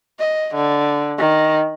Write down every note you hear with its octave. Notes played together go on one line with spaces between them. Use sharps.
D#5
D3
D#3